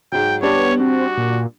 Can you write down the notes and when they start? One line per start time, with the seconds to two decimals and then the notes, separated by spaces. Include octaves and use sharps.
0.12 G#2 F#3 G5
0.42 G3 B3 D4 G4 C#5
0.80 C4 F#4
1.18 A#2